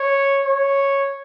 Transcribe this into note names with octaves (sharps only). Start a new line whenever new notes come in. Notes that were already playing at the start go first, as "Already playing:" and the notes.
Already playing: C#5
C#5